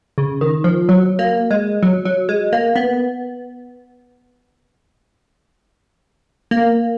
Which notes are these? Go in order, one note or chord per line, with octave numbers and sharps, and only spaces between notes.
C#3
D#3
F3
F#3
A#3
G#3
F#3
F#3
G#3
A#3
B3
A#3